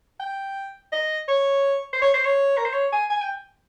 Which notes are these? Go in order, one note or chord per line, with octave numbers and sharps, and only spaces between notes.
G5
D#5
C#5
C5
C#5
C5
C#5
A#4
C5
C#5
G#5
G#5
G5